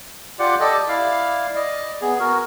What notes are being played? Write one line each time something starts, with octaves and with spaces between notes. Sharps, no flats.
F4 G4 D5 F#5
G4 A4 D5 D#5
E4 D5 F5
D5 D#5
B3 G#4
F#4 A#4